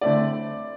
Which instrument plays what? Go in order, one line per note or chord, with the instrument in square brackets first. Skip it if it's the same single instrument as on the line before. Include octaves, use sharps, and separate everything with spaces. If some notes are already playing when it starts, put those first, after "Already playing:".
[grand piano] D3 A3 C4 E4 [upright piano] D5